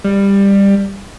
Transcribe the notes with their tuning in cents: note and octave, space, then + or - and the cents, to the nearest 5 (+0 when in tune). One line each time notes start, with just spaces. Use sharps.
G3 +15